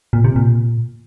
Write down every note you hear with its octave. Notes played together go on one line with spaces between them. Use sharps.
A#2
C3
A#2